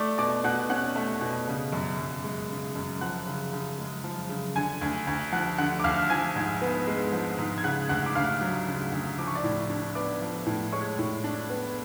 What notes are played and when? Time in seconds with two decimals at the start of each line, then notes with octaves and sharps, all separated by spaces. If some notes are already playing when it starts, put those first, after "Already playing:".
Already playing: A3 D5 D6
0.18 B2 D5 D6
0.44 B2 F#5 F#6
0.70 C#4 F#5 F#6
0.96 A3
1.21 B2
1.48 C#3
1.72 F#2
1.99 F#2
2.24 G#3
2.50 C#3
2.75 F#2
3.01 F3 F#5 F#6
3.27 C#3
3.52 C#3
3.78 G#3
4.04 F3
4.29 C#3
4.56 D3 G#5 G#6
4.81 D2
5.07 D2
5.32 F3 F#5 F#6
5.58 D3 F#5 F#6
5.80 D6
5.84 D2 F5 F6
6.10 F3 G#5 G#6
6.36 G#2
6.62 B3
6.87 G#3
7.13 F3
7.38 G#2
7.58 G#6
7.64 C#3 F#5 F#6
7.89 D2 F#5 F#6
8.06 D6
8.15 D2 F5 F6
8.41 F#3
8.67 C#3
8.92 D2
9.18 F3 D6
9.27 C#6
9.35 D5 D6
9.44 A2
9.70 D4
9.95 B3 D5 D6
10.22 F3
10.46 A2
10.73 G#3 C#5 C#6
10.99 A2
11.24 D4
11.50 B3